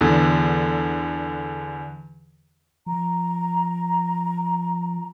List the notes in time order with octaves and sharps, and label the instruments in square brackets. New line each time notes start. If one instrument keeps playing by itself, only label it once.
[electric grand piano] E2 D3
[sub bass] F3 [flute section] A#5